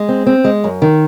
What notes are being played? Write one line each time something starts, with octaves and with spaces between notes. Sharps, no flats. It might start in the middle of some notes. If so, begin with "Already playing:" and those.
Already playing: G#3
C4
C4
G#3
F#2
D#3